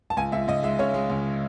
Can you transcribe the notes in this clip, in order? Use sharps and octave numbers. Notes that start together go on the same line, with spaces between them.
A5
C#2 G#5
C#2 E5
C#2 D#5
G#3 E5
C#3 C#5
G#3
C#2